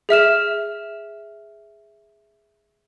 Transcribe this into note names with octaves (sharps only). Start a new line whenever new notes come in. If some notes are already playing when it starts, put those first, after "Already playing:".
G#4 E5 F6 E7